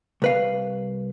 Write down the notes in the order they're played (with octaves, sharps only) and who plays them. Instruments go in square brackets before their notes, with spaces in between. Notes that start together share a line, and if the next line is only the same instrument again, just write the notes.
[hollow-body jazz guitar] C2 B4 F5